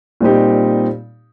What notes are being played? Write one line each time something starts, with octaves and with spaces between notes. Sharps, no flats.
A#2 G3 C4 D#4 G4